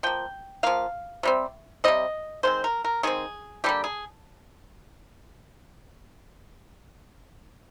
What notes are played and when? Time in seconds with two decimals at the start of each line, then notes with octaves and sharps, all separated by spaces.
0.03 F3 A#3 G5
0.63 F3 A#3 F5
1.23 C3 G3 C4
1.84 C3 G3 C4 D#5
2.43 D#3 G#3 C4 C5
2.64 A#4
2.84 A#4
3.03 D#3 G#3 C4 G#4
3.64 D3 G3 A#3 G4
3.84 G#4